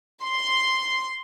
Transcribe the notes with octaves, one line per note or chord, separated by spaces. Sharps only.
C6